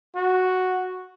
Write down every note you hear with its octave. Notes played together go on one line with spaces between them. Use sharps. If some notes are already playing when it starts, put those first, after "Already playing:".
F#4